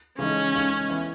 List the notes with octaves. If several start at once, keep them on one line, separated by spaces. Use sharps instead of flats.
C#3 E3 G#3 C#4 D#4 A4
C#2 C#3 G#3 D#4 A4
E3 B3 E4